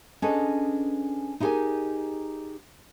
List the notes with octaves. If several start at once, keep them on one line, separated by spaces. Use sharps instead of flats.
C#4 D4 G#4 A4 B4 D#5
D#4 E4 G4 G#4 A#4 G#5